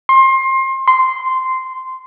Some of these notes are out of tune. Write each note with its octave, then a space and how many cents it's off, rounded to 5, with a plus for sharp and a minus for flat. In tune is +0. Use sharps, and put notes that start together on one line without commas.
C6 +25
C6 -10